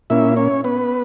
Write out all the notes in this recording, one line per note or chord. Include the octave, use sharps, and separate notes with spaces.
A#2 A#3 C#4 E4 E5
C#4 C#5
B3 B4